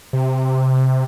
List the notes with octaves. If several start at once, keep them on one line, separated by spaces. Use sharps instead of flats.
C3